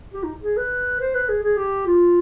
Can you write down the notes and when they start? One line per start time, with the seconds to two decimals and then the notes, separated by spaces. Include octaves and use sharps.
0.14 G4
0.24 D#4
0.43 G#4
0.57 B4
1.00 C5
1.15 B4
1.29 G#4
1.43 G#4
1.57 G4
1.87 F4